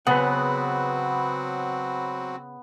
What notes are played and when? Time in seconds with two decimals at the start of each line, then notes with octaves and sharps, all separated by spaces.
0.07 C#3 F#3 B3 C4 F#4 B4 F#5